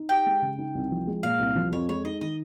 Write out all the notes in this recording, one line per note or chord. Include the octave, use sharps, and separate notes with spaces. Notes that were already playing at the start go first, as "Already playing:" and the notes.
Already playing: D#4
G4 G5
G#3
C#3
D#4
C2
F3
G#3
A#2 F5
C2
F3
F2 C#5
G#3 C#5
D#4 D#5
D#3 D#5